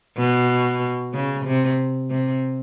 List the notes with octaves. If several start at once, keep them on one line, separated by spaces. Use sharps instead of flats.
B2
C#3
C3
C3